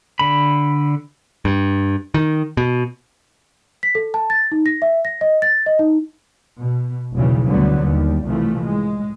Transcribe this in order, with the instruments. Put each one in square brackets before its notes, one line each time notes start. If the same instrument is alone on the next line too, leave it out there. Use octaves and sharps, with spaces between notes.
[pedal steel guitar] D3 B5
[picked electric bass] G2
D#3
B2
[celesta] B6
A4
A5
A6
D#4
A#6
E5
A#6
D#5
A6
D#5
D#4
[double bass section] B2
F1 B1 E2 C#3 E3 G3
D2 B2 D3 F#3 G3 B3
D#2 G3
C2 B2 E3 F3 A3
A2 G#3